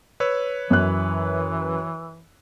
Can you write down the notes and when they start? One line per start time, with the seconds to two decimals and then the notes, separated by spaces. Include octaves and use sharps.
0.20 B4 C#5 E6
0.71 F#2 E3 F#6